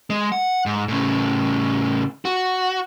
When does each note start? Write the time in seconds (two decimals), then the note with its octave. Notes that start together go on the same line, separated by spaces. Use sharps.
0.10 G#3
0.32 F#5
0.66 G#2
0.88 A2 C#3
2.25 F#4